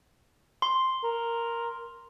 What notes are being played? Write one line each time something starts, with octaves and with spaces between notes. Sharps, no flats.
C6
A#4